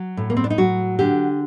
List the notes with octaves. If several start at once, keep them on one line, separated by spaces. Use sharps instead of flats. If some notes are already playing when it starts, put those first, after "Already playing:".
Already playing: F#3
A2
A#3
C4
D4
D#4
F#3 F#4
D3 G4